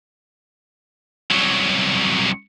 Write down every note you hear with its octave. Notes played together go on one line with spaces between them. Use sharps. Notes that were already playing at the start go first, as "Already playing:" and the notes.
C2 F#3